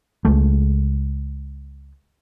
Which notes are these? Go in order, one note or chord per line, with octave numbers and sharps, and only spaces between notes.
C#2 G#3 A3